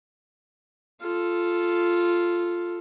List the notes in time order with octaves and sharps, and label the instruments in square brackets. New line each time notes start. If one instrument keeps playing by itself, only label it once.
[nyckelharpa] F4 A4